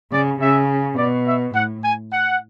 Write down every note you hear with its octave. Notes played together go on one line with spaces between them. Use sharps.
C#3 D5
C#3 E5
B2 D5
E5
A2 F#5
G#5
F#5